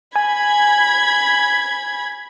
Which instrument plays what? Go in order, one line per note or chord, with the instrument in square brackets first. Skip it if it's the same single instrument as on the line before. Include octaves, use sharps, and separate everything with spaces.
[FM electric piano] G#5 [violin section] B5 G#6